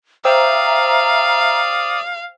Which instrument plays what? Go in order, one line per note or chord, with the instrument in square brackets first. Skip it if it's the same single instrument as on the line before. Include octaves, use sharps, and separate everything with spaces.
[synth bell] C5 G5 E6 [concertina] D5 D#6 [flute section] E5 A#5 [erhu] F5